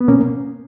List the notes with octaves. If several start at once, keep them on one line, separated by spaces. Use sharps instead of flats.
B3
B2 A#3 C#4